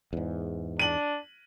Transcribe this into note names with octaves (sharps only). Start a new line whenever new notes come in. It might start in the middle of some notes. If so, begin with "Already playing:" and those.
E2 G#2
D4 D#7 F#7